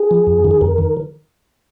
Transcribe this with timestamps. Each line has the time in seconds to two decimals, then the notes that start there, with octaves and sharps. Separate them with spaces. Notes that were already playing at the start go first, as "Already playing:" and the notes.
Already playing: G#4
0.11 F3
0.27 F2
0.44 D#3
0.51 G#4
0.61 F2 A#4
0.78 D#3